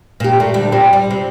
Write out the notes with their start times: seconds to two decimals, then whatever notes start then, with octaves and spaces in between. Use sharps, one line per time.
0.20 A#2 G4
0.40 A#2 A3
0.54 D2 G3 D4
0.72 A#2 G3 C4
0.93 G3
1.11 C3